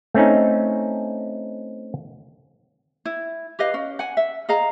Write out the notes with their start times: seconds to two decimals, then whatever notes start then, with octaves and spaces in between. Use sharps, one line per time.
0.14 A3 C4 C#4 D#4
3.05 E4
3.59 G4 B4 D#5 F5
3.74 C#4
3.99 F#5 G#5
4.17 E5
4.49 G#4 D#5 F5 A#5